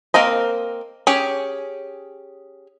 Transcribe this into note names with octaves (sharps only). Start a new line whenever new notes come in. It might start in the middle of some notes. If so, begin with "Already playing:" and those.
A#3 C4 A#4 D#5
C#4 G4 G#4